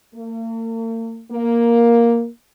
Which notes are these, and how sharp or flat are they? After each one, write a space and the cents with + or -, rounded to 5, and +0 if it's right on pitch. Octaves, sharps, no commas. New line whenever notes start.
A#3 -45
A#3 +5